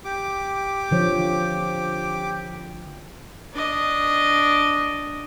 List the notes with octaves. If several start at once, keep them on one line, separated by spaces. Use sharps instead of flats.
G4 D6
D3 F3 C#5
D4 D#5